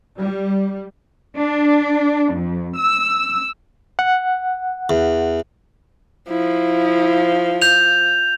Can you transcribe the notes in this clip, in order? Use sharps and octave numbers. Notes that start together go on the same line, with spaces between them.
G3
D4
F2
E6
F#5
E2
F3 E4
G6 F7